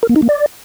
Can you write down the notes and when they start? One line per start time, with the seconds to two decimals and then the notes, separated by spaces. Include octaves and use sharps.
0.03 A#4
0.09 A#3
0.16 D#4
0.22 A#3
0.29 D5